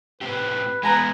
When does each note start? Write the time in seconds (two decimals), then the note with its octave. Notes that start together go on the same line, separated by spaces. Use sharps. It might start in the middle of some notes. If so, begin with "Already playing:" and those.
0.21 A2 C4 G4 B4
0.83 G#3 A#3 B3 G#5 A#5 D#7